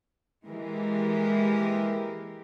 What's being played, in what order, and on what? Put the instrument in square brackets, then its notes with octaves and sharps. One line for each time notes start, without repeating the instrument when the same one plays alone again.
[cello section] E3 G#3 A#3 G4 A#4